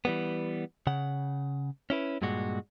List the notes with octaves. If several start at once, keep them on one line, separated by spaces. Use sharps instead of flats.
E3 G3 B3
C#3 F#5
C#4 E4 B4
G2 A#2 G#3 F#4